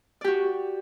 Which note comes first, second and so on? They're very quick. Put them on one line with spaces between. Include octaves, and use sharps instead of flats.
D5 G4 F#4